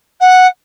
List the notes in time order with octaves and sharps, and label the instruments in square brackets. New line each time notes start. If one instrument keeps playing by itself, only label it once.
[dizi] F#5